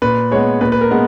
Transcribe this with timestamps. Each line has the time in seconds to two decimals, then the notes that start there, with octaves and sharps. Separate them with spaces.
0.02 A#2 B4
0.31 G#3 B3 C#5
0.61 A#2 B4
0.72 B4
0.81 A#4
0.91 G#3 B3